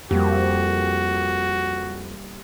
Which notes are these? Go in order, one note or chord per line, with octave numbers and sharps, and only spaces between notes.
F2 G3 A#3 F#4 G4